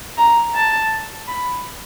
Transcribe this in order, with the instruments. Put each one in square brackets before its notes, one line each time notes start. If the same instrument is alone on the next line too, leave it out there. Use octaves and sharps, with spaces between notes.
[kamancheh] A#5
A5
B5